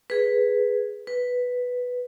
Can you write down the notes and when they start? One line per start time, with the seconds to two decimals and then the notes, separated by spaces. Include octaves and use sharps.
0.10 G#4 B4
1.07 B4